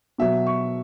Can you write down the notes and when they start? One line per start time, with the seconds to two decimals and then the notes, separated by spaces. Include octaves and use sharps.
0.18 B2 F#3 E5
0.47 C#6